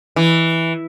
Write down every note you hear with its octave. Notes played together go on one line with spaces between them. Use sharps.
E3